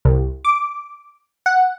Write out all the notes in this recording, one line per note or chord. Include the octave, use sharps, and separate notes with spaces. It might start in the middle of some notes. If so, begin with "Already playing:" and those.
C2
D6
F#5